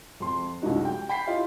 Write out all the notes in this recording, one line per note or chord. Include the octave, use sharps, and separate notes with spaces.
F2 C6
C2 F#2 F3 G#3 D#4 F#4
G5
G5 B5 B6 C7
E4 F4 G4 D#5 F5